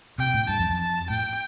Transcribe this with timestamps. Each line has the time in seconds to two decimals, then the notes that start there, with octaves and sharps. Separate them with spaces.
0.18 C3 G5
0.34 A2
0.49 G2 A5
0.59 F2
0.70 F2
0.80 A5
1.10 A2 G5